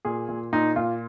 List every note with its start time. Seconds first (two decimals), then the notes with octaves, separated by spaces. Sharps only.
0.05 A#2 G#4
0.29 A#2
0.53 A#2 D#4
0.76 A#2 F4